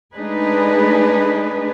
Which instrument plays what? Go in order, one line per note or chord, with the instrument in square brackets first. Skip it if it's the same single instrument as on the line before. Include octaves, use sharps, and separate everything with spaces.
[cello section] G#3 A3 D4 D#4 G#4 B4